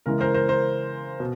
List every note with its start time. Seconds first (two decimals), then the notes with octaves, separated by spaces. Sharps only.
0.06 C#3 E3 G#3 A#4
0.21 A#4 C5
0.34 A#4 C5
0.48 A#4 C5
1.20 B2